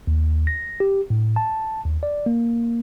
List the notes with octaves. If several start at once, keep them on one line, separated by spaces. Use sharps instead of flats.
D#2
A#6
G4
A2
A5
D#2
D5
A#3